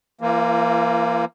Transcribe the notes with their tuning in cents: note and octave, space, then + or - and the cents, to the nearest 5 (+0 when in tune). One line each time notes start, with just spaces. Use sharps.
E3 +40 A#3 +0 F4 -40